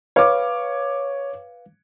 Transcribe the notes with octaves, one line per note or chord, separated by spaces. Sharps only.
B4 C#5 F5 D6